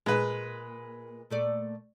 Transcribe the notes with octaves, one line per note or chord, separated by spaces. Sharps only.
A#2 G#3 B4
A#2 A3 D5